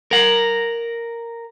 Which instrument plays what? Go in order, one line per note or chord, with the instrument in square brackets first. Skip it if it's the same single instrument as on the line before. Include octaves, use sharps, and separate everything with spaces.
[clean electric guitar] A#4 F#5